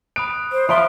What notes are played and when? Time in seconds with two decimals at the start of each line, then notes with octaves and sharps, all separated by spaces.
0.16 B5 D#6 F#6 D7
0.52 C5 D#6
0.69 F3 E5 B5 C6 D7 G7